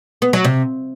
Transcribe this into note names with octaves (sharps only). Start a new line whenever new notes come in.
B3
F#3
C3